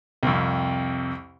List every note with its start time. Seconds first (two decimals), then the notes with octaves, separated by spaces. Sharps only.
0.23 C2 F2